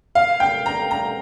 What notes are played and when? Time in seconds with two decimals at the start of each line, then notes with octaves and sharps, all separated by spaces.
0.15 F5
0.40 G5
0.66 A#5
0.91 A#5